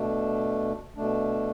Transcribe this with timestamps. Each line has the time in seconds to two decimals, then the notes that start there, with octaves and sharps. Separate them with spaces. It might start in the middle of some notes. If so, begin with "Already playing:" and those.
Already playing: B2 A3 D4
0.96 B2 A3 D4